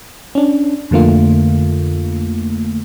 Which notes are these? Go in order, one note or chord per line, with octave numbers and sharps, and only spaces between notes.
C#4 D4
F2 D3 A3 A#3 F4